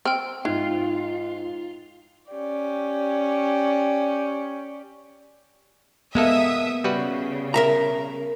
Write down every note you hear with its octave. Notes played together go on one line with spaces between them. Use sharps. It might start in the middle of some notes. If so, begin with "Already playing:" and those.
C4 G5 E6 F6
G#2 E3 F4
C#4 G4 D5
G#3 A#3 B3 A4 E5 D#6
C#3 G3 F#4 B4
A#4 E5 A#5